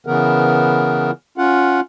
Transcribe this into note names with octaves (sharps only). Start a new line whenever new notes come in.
C#3 E3 B3 A#4
C#4 F4 F#5